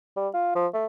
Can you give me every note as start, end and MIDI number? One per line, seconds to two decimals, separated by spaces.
0.17 0.28 55
0.34 0.55 65
0.55 0.67 53
0.74 0.86 57